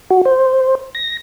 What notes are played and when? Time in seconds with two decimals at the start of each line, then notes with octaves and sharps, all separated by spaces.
0.10 F#4
0.25 C5
0.95 A#6